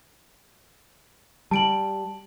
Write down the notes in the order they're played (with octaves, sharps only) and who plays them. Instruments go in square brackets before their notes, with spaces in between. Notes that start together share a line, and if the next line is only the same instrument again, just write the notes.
[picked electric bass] G3 [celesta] A5 D7 F#7